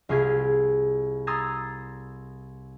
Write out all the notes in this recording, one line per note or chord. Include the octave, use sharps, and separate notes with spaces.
C2 F4 G#4 G#6 B6
A#5 C6 D#6 E6 G#6 A6